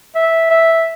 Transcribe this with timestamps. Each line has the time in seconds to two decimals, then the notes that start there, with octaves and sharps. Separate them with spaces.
0.15 E5
0.50 E5